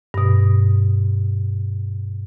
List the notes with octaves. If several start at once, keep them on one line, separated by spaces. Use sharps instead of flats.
G2 B2